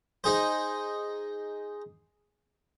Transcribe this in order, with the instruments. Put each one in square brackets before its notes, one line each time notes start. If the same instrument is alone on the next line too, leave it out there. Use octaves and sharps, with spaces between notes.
[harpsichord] D#4 G#4 C5